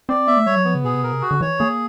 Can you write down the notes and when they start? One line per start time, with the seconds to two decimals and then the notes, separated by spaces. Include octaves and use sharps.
0.09 C4 D5
0.27 B3 E5
0.37 A3
0.46 G3 C#5
0.56 F#3
0.65 F3 B3
0.75 C#3
0.84 B2 G#4
0.94 C3
1.03 B2 A#4
1.12 C3
1.22 F#4
1.31 D3
1.41 E3 C#5
1.60 A#3 G#4